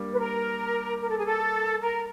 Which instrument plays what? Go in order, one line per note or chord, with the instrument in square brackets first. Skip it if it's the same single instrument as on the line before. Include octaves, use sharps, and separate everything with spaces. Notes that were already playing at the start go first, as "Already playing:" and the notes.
Already playing: [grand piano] G3 A#3 D4
[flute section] B4
A#4
A#4
A4
G#4
A4
A#4